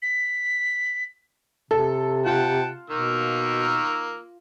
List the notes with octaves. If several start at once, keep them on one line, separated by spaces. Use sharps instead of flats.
B6
C3 A4
F4 F#5 G5 A5
B2 D#3 A#3 E6